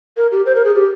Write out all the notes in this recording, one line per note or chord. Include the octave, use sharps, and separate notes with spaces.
A#4
G4
C5
A#4
G#4
G4